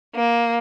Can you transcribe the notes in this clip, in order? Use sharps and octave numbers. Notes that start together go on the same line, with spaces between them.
A#3